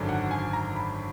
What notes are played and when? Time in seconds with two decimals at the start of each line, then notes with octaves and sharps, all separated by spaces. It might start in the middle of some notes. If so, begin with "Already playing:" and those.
Already playing: G#1 F#2 D3
0.09 F#5
0.31 G#5
0.53 A#5
0.76 B5